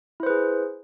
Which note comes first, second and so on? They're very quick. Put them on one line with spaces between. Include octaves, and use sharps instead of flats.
E4 C5 B4 G#4